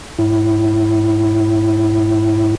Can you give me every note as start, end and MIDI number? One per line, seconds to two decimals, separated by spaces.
0.19 2.55 44
0.19 2.55 64